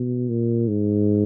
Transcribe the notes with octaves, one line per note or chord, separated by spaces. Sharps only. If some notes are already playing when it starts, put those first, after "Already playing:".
Already playing: B2
A#2
G#2